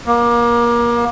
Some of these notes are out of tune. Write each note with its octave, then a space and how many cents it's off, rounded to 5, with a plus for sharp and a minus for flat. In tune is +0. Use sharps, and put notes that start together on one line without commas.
A#3 +25